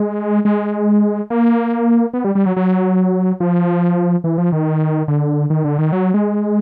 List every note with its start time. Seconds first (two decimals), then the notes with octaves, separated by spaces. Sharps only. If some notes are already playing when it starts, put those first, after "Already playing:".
Already playing: G#3
0.45 G#3
1.30 A#3
2.13 B3
2.24 G3
2.35 G3
2.46 F#3
2.56 F#3
3.40 F3
4.24 E3
4.38 F3
4.52 D#3
5.08 D3
5.50 D#3
5.64 D3
5.79 D#3
5.92 F#3
6.14 G#3